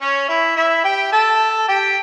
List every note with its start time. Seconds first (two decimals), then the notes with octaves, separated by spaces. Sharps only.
0.01 C#4 C#5
0.28 E4 E5
0.56 E4 E5
0.84 G4 G5
1.12 A4 A5
1.68 G4 G5